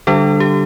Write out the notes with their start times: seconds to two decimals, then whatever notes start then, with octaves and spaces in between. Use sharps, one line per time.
0.07 D3 G3 D4 A4
0.40 G4